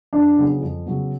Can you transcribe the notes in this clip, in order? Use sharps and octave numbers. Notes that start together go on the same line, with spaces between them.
F2 D4
C#3 F#3 B3
F2
C#3 F#3 B3